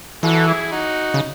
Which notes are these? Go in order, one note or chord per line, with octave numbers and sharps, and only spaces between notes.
E3 F#4 A4
E4 G#4
D#4 F#4
C#3